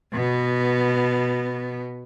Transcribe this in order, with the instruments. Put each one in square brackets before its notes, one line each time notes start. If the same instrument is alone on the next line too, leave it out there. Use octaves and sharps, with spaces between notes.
[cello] B2 B3